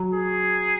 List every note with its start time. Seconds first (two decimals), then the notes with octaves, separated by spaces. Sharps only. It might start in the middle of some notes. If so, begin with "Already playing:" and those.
Already playing: F#3
0.13 G#4